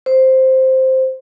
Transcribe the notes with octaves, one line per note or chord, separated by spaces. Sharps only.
C5